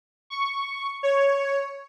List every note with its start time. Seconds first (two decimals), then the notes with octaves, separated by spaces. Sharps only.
0.30 C#6
1.03 C#5